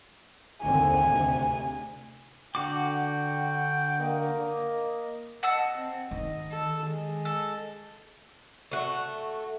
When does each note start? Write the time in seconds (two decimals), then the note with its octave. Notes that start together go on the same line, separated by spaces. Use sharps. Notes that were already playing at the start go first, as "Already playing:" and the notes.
0.63 D#2 D3 C4 G#5
1.10 D2 C3
2.55 D3 F#4 G5 D6
4.01 A#3 D#5
5.43 D#5 F#5 A5 E6
5.78 C4
6.11 D#3 D#5
6.51 A4
6.87 G#3
7.25 A4
8.71 A3 F#4